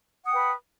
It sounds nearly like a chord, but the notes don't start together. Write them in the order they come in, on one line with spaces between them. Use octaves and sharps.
F#5 D#6 G5 B4